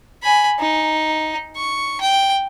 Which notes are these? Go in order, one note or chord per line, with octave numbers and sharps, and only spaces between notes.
G#5 B5
D#4
C#6
G5